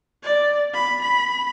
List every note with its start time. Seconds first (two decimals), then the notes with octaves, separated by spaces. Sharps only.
0.23 D5
0.74 B5
1.02 B5